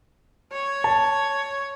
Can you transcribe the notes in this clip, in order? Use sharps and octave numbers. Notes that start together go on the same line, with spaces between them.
C#5
A5